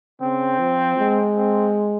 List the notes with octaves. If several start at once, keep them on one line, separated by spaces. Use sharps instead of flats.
C#3 C4
F3
G#3
C4